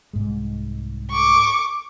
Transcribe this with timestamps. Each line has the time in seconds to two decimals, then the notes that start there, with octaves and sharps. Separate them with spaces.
0.13 C2 G#2 G#3
1.11 C#6 D6